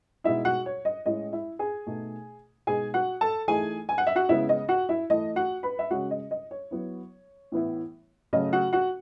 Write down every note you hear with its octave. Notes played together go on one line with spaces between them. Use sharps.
B2 G#3 D#4 E4 E5
F#4 F#5
C#5
D#5
A2 G#3 C#4 E4 D#5
E4 E5
G#4 G#5
B2 A3 D#4
B2 G#3 D#4 G#4 G#5
F#4 F#5
A4 A5
E3 A3 D#4 G#4 G#5
G#5
F#5
E5
F#4 F#5
C#3 G#3 B3 E4 E5
D#5
F#4 F#5
E4 E5
E3 A3 E4 D#5
F#4 F#5
B4 B5
E5
C#3 G#3 C#4 F#4 F#5
D#5
D#5
C#5
F#3 B3 E4
A2 E3 B3 E4
C#3 F#3 A3 D#5
F#4 F#5
F#4 F#5